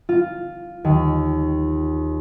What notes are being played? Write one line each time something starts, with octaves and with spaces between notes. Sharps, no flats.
F4
D#2